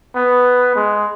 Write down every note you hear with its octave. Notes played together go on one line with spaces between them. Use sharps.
B3
G#3